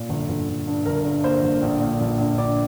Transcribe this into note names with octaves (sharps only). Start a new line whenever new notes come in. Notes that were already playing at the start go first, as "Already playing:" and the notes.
Already playing: A#2
G1
G1
G1
G2
G1 A#4
G2
A#3 C5
G1
A#1
A#2
A#1
A#1
A#1 D5